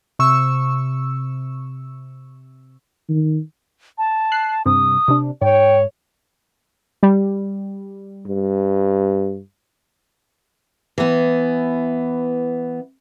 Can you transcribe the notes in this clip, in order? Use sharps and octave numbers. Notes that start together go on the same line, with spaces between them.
C3 C#6 E6
D#3
A5
F#6 C7
G2 C3 D#6
C3 D4
G#2 C#5 G5
G3
G2
E3 B3